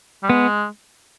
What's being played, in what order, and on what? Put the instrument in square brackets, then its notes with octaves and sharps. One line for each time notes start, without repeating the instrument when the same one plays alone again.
[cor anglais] G3
[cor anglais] G#3 [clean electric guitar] B3